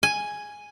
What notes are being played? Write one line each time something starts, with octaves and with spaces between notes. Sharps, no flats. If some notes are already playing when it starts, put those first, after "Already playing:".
G#5